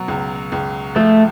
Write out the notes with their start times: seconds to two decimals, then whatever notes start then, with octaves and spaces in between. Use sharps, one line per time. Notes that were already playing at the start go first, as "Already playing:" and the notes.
Already playing: B2 F#3
0.08 C#2
0.52 C#2
0.96 F3 A3